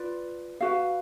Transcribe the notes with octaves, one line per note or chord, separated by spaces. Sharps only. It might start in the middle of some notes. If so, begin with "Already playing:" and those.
Already playing: F4 B4 D5
F#4 B4 F5